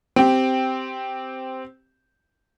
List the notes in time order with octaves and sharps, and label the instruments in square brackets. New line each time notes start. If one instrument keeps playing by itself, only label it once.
[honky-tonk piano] C4 G4